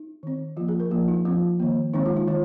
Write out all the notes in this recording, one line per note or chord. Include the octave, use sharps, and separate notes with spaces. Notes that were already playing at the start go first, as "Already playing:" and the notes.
Already playing: D#4
D#3 C4
F3 A#3 F4
G#4
A#4
F3 A#3 F4
D#4
F3 C4 F4
D#3 A#3
D#3 G#3 C4 D#4
F4
D#4
D#3 F4